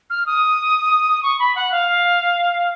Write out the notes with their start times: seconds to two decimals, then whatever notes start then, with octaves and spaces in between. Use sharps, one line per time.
0.10 F6
0.26 D#6
1.23 C#6
1.39 B5
1.55 F#5
1.71 F5